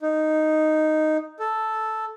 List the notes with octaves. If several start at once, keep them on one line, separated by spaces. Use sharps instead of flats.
D#4
A4